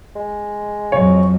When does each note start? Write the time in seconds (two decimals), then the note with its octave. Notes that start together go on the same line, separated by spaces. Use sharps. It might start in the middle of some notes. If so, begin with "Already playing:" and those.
0.16 G#3
0.92 F2 F#3 C#5